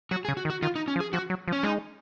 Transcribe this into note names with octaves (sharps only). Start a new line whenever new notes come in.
F#3 F#4
G#4
C#3
F#4
D#3
F#4
D#3 F4
D#4
C#4
F3
G#4
F3 F#4
F#3
F3
C#4
G#3 D#4